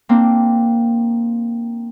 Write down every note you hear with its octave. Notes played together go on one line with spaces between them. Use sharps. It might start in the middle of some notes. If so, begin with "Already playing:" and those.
A#3 C4 D4